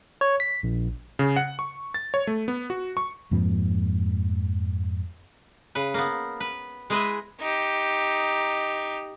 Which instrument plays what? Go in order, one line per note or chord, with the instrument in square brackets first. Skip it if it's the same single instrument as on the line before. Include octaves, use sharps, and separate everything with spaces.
[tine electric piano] C#5
B6
A#1
[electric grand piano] C#3
F#5
C#6
A6
C#5
A3
B3
F#4
C#6
[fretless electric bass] F2 G#2 F3 A#3
[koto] C#3 B4
A#3 B3
B4
G#3 E4 G#4 B4 D#5 E5
[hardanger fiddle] D#4 G4